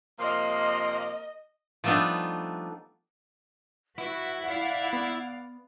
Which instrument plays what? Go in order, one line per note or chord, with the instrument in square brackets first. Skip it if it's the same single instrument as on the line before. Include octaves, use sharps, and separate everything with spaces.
[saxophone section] C3 F3 A#3 [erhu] D#5 [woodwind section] C6
[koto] F3 G3 A3 B3 D4 D#4
[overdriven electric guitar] E4 E5 [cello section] F#4 B4 [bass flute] F#5
[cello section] D5 F5
[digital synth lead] B3